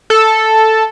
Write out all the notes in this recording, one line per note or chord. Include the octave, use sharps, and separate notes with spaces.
A4